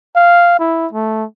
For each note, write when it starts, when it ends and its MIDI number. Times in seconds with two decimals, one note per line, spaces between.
0.16 0.58 77
0.60 0.87 64
0.93 1.25 57